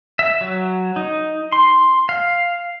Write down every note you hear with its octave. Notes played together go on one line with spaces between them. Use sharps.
E5
F#3
D#4
C6
F5